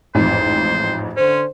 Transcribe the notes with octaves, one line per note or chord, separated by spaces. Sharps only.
A1 F2 G#2 C5
D3 C#4 C5